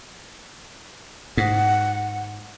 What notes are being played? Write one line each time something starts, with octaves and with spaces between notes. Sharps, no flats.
G#2 F#5